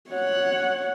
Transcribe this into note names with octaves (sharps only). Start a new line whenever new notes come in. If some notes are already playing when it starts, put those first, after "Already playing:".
C#5 F#5